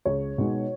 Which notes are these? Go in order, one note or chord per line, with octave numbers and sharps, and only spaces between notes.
C#2 C#5
B2 G#3 D#4